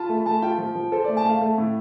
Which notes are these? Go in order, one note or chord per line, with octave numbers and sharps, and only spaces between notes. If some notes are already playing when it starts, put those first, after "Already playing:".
Already playing: F4 A5 B5
A3
A3 A5
F4 G5
F3
F3
A4 C5
D5
A3
A5
A3 F5
A3
A2